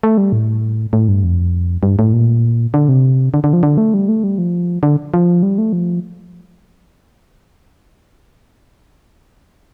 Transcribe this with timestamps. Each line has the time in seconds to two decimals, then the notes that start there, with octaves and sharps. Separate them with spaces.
0.03 A3
0.18 G3
0.33 A2
0.93 A2
1.08 G2
1.24 F2
1.83 G2
1.99 A2
2.13 A#2
2.74 D3
2.89 C3
3.34 D3
3.44 D3
3.53 F3
3.63 D3
3.78 A3
3.94 G3
4.09 A3
4.24 G3
4.38 F3
4.83 D3
5.14 F3
5.43 G3
5.58 A3
5.73 F3